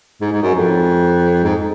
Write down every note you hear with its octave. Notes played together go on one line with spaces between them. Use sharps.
G#2
G#2
F#2
F2
G#2